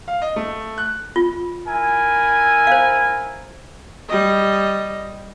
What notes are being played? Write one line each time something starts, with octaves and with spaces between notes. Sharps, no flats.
F5
D#5
A3
F#6
F4
E4 A#4 G#5
C5 F5
G3 D#5